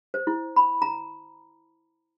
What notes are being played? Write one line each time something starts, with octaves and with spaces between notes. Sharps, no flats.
C5
E4
B5
A#5